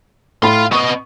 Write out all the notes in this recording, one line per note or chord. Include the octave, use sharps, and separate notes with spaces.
A2 F5 B5 C6
B3 D#5 C#6